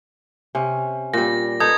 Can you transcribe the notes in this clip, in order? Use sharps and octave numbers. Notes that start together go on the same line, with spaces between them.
C3 C#4
A#2 G3 A#6
D#4 A4 B4 D#6 G#6